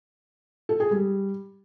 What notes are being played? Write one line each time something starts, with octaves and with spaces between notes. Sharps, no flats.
A4
G#4
G3